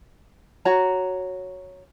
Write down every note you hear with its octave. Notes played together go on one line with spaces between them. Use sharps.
F#4 C#5 A#5